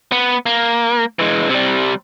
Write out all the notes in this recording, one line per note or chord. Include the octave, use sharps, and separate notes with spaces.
B3
A#3
E3 G#3
C3 G3